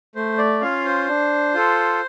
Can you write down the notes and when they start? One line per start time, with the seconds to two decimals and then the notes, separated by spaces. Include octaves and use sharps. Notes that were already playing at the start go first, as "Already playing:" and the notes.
0.16 A3 C5
0.38 D5
0.61 C#4 F4 F5
0.85 C5
1.08 D4
1.54 F4 A4